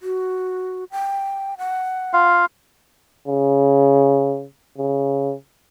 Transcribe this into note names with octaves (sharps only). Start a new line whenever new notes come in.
F#4
G5
F#5
F4 F5
C#3
C#3